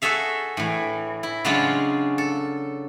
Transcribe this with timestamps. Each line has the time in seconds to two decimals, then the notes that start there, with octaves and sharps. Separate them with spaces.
0.02 F#4 G#4 A4 E5 F5
0.57 A2 E3
1.23 E4
1.45 C#3 F#3 G#3 C#4 D4 F4
2.18 A4